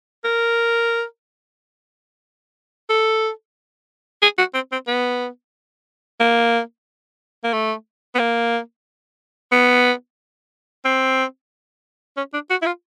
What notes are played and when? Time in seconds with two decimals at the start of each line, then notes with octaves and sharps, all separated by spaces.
0.24 A#4
2.90 A4
4.22 G#4
4.39 F#4
4.55 C4
4.72 C4
4.88 B3
6.20 A#3
7.44 A#3
7.53 A3
8.15 B3
8.19 A#3
9.52 B3
10.85 C4
12.17 C#4
12.34 D4
12.50 F#4
12.62 E4
12.66 F4